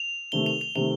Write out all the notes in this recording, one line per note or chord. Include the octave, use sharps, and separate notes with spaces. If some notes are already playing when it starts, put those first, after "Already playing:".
Already playing: F7
C3 D#3 A3 G7
F7
F7
C3 D#3 A3 F7